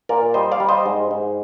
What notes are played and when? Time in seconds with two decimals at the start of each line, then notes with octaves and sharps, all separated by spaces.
0.09 A#2 A#4 D5
0.34 G3 C5 D#5
0.52 D5 F5
0.60 G3
0.69 C5 D#5
0.86 G#2
1.11 G#2